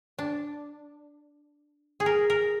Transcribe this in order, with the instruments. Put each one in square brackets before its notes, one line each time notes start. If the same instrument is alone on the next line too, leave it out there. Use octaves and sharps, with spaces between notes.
[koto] D4
G#4
A#4
A#4